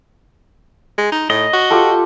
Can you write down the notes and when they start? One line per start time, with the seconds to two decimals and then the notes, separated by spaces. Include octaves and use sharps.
0.98 G#3
1.12 D#4
1.30 A2 D#5
1.53 F#4
1.70 F4 G4 A4